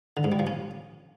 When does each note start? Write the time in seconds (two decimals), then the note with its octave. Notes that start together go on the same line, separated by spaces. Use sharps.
0.17 D3
0.24 G#2
0.32 G3
0.39 F3
0.47 C#4